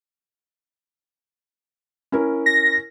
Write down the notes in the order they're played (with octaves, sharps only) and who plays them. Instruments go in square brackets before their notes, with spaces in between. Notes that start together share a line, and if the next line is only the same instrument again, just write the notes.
[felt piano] C#4 E4 A#4
[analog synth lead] A#6